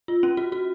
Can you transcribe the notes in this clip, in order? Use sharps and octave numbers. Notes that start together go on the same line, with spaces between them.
F4
C#4
F#4
F#4